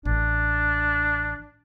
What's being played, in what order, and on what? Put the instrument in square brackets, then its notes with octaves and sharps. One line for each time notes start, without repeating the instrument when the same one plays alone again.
[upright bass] A1 [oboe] D4